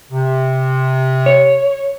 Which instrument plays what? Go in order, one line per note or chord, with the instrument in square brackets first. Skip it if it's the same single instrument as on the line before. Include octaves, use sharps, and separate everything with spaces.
[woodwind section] C3
[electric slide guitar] C#5